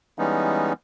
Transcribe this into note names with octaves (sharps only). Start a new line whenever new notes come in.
E3 G3 G#3 B3 C#4 D#4